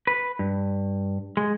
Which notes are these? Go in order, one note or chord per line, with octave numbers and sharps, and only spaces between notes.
B4
G2
G#3